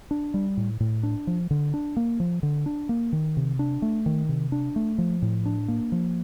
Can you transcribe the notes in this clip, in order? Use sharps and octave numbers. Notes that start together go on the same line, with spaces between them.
D4
G3
A2
A2
D4
F3
D3
D4
A#3
F3
D3
D4
A#3
D#3
C3
D4
A3
D#3
C3
D4
A3
F3
A2
D4
A#3
F3